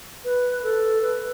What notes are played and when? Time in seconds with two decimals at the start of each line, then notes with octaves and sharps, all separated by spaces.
0.25 B4
0.64 A4
1.02 B4